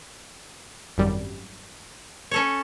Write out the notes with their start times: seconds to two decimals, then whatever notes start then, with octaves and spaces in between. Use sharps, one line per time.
0.98 G#1 F#2 G3
2.31 C#4 A4 C#5